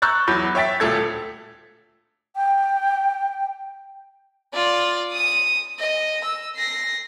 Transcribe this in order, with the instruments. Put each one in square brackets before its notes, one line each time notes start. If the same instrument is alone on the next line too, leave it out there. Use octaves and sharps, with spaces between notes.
[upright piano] A#5 C#6 E6 F#6 G6 A6
E2 F#3 B5 G6
C#5 E5 G5 A6 B6
D#1 D2 A#2 A4 G#6
[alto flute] G5
[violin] F4 D5
D#6 D#7
D#5
E6
A#6 C7